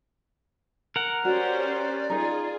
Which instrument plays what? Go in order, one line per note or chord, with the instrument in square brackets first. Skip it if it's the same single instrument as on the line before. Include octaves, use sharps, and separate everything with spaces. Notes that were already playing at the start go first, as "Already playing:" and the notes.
[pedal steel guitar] A#4 F#5
[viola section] C#4 G4 C5 [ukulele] F#4 [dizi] D5
[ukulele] D#4 A#4 [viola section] F4 G#4